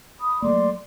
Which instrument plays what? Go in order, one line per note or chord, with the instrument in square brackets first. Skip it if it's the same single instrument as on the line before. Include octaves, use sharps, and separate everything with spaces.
[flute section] B5 D#6
[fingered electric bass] F#3 A3 A#3 [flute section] D5 C6 D6